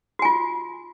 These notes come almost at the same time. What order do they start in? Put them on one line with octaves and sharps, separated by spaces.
F#4 G#5 F4